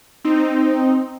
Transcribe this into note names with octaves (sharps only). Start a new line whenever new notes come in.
C4 D#4